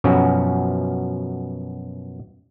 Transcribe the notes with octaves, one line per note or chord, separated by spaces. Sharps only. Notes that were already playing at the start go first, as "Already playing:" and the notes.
F#2 B2 F3 C#4 F#4